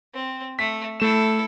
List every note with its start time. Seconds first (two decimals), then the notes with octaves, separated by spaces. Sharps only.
0.14 C4
0.59 A3 B6
1.00 A3 E4 A4 E7